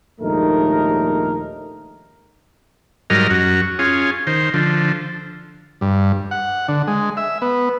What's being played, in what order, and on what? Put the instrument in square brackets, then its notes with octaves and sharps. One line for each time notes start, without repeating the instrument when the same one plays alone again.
[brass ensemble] A#1 D#2 G#2 A3 D#4 A#4
[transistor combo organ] G#2 F#3 G3 A#4 D#5 F6
F#2 F#4
C#4 F4 G#4
D#3 C5
D3 F3
G2
F#5
D3
G#3
E5
B3